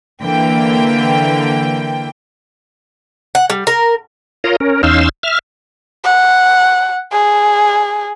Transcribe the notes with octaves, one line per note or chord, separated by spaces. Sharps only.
D3 E3 A#3 G5
F#5
G3
A#4
F4 A#4 C#5 A#5 C6 D#6
C#4 A#4
E2 C#4 D#4 F5 C6 E6
E5 F6
F#5
G#4